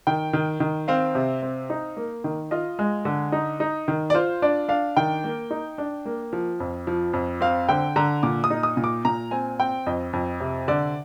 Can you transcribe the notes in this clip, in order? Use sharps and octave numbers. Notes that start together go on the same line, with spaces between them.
D#3 G5
D#3
D#3
C4 F5
C3
C4
D#4
A#3
D#3
F4 D#5
G#3
D3
D#4
D#4
D#3
D5
F4 C5
D4 D5
D4 F5
D#3 G5
A#3
D#4
D4
A#3
F3
F2
F3
F2
C4 F5
D3 G5
D3 A#5
A#2 D6
D#6
D#4
D#6
A#2
D6
A#2 A#5
C4 G#5
C4 G5
F2 D#5
F2
C3
D3 D5